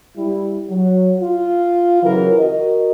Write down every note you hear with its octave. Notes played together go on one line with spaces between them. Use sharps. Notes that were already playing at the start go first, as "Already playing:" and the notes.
G3 E4
F#3
F4
C#3 E3 F#3 A#4
F#4 A#4 D#5